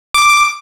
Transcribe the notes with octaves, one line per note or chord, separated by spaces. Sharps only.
D6